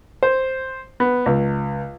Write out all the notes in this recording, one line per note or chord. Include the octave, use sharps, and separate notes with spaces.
C5
B3
C#2